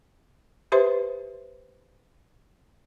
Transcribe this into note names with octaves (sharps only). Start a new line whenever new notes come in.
G4 B4 C5 E5 C6